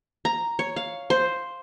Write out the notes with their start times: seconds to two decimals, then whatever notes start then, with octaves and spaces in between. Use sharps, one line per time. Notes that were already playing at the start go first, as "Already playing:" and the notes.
0.25 A#5
0.59 C#5
0.76 F5
1.10 C5